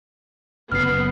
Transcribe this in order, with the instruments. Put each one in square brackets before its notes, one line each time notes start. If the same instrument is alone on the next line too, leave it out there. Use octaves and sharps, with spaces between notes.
[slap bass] F#1 F#2 [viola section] B3 [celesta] F6 C7